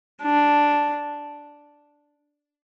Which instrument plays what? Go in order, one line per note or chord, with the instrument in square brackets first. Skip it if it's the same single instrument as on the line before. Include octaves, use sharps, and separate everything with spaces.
[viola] D4